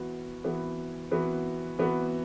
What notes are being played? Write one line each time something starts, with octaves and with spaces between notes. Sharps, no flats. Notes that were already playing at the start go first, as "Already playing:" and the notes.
Already playing: E3 B3 F#4
E3 B3 F#4
E3 B3 F#4
E3 B3 F#4